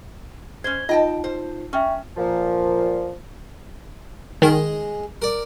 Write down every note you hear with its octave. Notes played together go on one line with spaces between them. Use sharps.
C#4 C5 G#6 G7
D#4 F4 D#5 G5 A5
C5
C#4 E5 G5 C#6
A#2 F3
D#3 G#3 G#4 D#5
A#4 D5